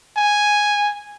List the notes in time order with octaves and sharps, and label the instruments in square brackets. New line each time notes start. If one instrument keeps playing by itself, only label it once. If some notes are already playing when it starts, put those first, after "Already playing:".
[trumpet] G#5